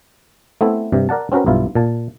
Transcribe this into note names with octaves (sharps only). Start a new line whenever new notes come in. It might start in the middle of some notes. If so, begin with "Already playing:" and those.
A3 B3 C4 E4 A4
G2 C3
A#4 D5 F#5 A5
C4 C#4 F#4 A#4 B4
B1 G2 E4 F4
A#2 A5